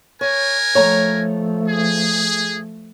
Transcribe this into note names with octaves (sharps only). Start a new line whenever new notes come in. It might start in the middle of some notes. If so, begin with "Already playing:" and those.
A#4 C#5 G#5
F3 A3 C#5 A#5
G#4